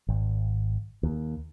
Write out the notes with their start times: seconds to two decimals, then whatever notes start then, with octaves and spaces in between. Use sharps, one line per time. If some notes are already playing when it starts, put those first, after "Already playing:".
0.09 G#1
1.03 D#2